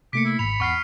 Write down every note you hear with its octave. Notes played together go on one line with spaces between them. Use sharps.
C3 A3 A#3 D6 B6 C#7
E4
G#1 G#2 B5 F7
E2 F#5 C#6 F6 B6 C7